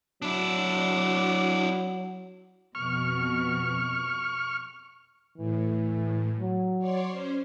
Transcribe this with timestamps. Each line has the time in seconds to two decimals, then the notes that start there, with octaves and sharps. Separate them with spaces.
0.22 F#3 D4 E4
2.75 F2 B2 C#6 F6
5.38 A2 E3
6.39 F#3
6.79 C#5 D5 C6
7.09 C#4 C5